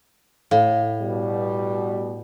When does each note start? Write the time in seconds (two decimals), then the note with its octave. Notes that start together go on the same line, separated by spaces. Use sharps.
0.51 A2 F5
1.01 B2 G3